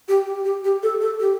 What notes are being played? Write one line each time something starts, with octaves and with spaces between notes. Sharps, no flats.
G4
G4
G4
G4
A4
A4
G4